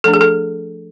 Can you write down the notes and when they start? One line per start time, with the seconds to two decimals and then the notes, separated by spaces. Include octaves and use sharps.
0.04 F3 A3 D4 A4
0.14 G#4
0.21 A4